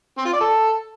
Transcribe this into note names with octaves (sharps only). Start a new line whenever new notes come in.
C4
F4
D5
A4